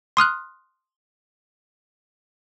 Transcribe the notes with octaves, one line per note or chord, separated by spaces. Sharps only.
C6 D#6 F6 F#6